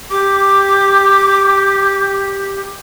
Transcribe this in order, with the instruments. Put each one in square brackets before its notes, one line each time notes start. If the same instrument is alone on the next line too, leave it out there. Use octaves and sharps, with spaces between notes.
[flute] G4 [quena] D6